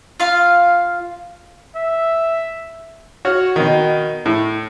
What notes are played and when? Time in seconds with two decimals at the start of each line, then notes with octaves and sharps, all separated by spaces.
0.20 F4 F5
1.75 E5
3.25 F#4 C#5 F6
3.56 B2 D#3
4.26 A2